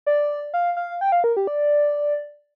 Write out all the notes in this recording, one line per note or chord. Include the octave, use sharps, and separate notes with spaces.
D5
F5
F5
G5
F5
A#4
G4
D5